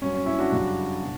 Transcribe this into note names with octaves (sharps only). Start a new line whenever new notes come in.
G2 F#3 C#4
C#4
C#4 E4
D4 F#4
F#2 C#3 G3
B2